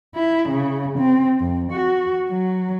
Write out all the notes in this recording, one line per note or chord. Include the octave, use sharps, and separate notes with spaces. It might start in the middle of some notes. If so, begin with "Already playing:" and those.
E4
C#3
C4
F2
F#4
F#3